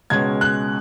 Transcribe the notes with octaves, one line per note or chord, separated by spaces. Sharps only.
C#2 B2 G#3 C#4 G#6
F#6